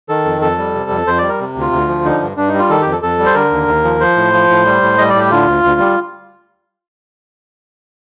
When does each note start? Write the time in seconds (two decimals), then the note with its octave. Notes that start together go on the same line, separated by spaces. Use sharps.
0.09 D#3 A4
0.25 F2
0.41 F2 A4
0.58 G3
0.75 C3
0.90 F2
1.07 F2 C5
1.18 G3 D5
1.29 A#4
1.40 C3
1.55 D2
1.61 F4
1.72 D2
1.88 F3
2.05 D3 D#4
2.21 G2
2.37 G2 D4
2.48 D#4
2.54 G3
2.59 F4
2.70 D#3 A4
2.81 F2 G4
2.92 A4
3.02 F2 A4
3.19 G3
3.26 C5
3.35 D3 A#4
3.51 D#2
3.68 D#2
3.84 F3
4.00 F3 C5
4.17 A2
4.33 F3
4.49 A2
4.66 G3
4.82 A2
4.98 G3 D#5
5.09 D5
5.15 A2 G4
5.31 D3 F4
5.47 D2
5.64 D2
5.80 G3